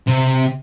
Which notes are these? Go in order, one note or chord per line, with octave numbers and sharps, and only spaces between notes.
C3